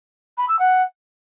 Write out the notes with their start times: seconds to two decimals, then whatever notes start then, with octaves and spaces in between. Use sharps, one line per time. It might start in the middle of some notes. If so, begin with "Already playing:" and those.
0.38 B5
0.48 E6
0.59 F#5